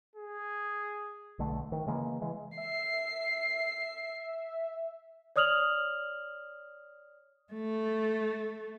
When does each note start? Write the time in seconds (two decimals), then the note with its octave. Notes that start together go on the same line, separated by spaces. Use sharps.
0.16 G#4
1.39 B1 D3 A3
1.72 D#3
1.87 C#3 E3 G#3 A#3
2.21 C#3 E3 G#3
2.57 E5 C7
5.36 C#5 D5 D#6 F6 F7 F#7
7.53 A3